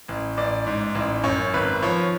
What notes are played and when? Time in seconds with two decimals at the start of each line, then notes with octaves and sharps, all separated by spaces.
0.08 A1
0.37 A1 D5
0.67 G#2
0.95 A1
1.24 F#2 C#5
1.54 G#1 B4
1.82 F3 C#5